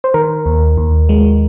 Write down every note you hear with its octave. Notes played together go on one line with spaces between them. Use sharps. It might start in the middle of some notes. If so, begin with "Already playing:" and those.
C5
D#3 A#4
D#2
D#2
G#3